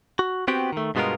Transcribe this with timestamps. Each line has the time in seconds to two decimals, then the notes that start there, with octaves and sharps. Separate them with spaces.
0.19 F#4
0.48 B3 C4 F#4 G4 G5
0.73 D#3 A3
0.95 G2 B2 G#3 B3 F4 A#4